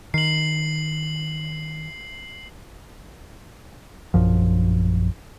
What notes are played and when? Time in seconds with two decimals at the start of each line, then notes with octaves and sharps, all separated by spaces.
0.14 D#3 C7 F#7
4.14 A#1 F#2 F3